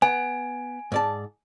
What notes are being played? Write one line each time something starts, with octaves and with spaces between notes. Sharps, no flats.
B3 G#5
G#2 D5 A5